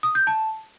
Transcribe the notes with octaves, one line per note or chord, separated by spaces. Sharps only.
D#6
G6
A5